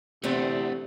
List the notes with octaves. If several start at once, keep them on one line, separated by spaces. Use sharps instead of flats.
E2 C3 A3 B3 C4 D4